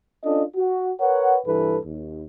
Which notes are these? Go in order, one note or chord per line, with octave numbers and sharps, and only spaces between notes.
C#4 D4 F4 A4 D#5
F#4
A#4 B4 C#5 F#5
C2 G2 E3 A4 B4
D#2